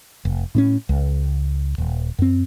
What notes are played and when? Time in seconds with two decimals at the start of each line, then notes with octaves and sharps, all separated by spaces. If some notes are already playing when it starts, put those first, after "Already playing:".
0.25 F1
0.55 A2 B3 C#4
0.89 C#2
1.78 D#1
2.19 F#2 C4